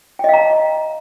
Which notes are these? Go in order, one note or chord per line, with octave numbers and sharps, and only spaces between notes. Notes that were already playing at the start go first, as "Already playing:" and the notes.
D#5 F5 G5 A#5